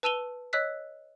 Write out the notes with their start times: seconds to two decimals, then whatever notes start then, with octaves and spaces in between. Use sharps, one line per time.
0.03 B4 A5 E6 D#7 F7 G7
0.53 C#5 D#5 E6 F#6 B6